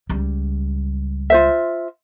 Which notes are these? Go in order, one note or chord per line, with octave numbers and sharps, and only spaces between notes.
C#2 G3
F4 C5 E5